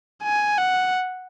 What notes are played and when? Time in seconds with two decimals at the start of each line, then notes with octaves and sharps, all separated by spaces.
0.23 G#5
0.58 F#5